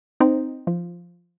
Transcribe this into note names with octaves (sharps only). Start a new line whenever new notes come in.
C4 D#4
F3